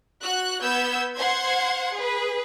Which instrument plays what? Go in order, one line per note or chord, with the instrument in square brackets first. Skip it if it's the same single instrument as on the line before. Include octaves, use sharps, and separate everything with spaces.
[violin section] F#4 F#6
B3 E6 G6 G#6
C5 F#5 C6 G#6
G#4 B4